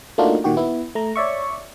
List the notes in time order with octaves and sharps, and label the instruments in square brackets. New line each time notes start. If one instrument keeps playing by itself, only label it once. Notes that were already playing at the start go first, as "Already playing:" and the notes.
[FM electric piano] A3 A#3 D4 D#4 F4 F#4
A#2 D#3 F#4 G4
B3 E4
A3 A#5
C#5 D5 E5 C#6